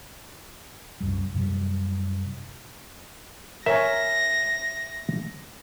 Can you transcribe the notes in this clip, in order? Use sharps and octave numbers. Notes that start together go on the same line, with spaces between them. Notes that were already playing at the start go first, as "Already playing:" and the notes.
C2 F#2 G3
F#2 C3 F#3 G3
A#4 C#5 E5 G#5 A#6